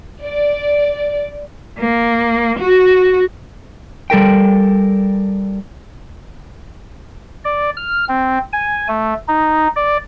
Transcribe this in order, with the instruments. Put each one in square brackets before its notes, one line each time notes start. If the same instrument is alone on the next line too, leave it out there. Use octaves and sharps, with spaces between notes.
[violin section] D5
[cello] A#3
F#4
[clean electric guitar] G3 A4 A#4 G5
[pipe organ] D5
F6
C4
G#5
A3
D#4
D5